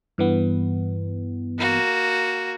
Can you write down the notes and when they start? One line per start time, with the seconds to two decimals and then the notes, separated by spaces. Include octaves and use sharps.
0.18 G2 E3 B3
1.58 A#3 F#4